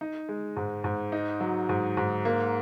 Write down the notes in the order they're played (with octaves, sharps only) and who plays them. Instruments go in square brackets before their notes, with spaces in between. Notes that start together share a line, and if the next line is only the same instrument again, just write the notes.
[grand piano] D#4
G#3
G#2
G#2
D#4
F#3
G#2
G#2
A#3